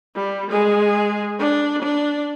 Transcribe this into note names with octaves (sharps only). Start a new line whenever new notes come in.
G3
G#3 G#4
D4
D4